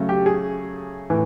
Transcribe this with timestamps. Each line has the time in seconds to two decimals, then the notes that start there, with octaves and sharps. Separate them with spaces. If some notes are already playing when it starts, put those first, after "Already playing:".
Already playing: C#3 F#3 A3
0.09 G4
0.26 G#4
1.10 A2 E3